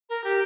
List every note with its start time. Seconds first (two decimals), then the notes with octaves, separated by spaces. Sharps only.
0.09 A#4
0.24 G4